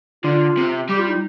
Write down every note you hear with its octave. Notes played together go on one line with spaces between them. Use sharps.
D3 F4
C3
G3 G4
F4
D#4